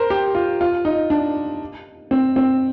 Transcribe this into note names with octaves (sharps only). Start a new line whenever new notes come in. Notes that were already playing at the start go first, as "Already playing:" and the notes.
Already playing: A#4 C5
G4
F4
F4
D#4
D4
C4
C4